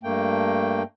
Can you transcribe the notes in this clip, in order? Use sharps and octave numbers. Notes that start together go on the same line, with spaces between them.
G2 A3 A#3 G5